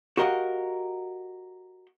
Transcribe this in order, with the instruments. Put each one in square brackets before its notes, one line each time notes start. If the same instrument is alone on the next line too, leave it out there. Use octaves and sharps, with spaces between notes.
[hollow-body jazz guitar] F#4 G4 A#4 D#5 F5 F#5